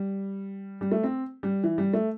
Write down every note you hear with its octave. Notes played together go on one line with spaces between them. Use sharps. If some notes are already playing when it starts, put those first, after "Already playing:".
Already playing: G3
G3
A3
C4
G3
E3
G3
A3